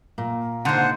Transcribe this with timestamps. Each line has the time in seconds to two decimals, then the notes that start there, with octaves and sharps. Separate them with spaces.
0.18 A#2 A#3
0.65 G#2 D3 A#3 C5 F#5